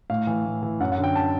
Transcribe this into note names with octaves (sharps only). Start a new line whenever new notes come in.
A2 F5
E3
A2
E3
F#2 F#5
F#5
D3
G5
A5